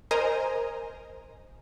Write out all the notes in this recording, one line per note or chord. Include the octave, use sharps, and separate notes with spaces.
A#4 C5 D#5 G#5 A#5